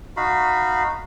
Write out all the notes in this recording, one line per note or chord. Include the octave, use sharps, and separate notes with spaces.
D#4 F#4 F5 B5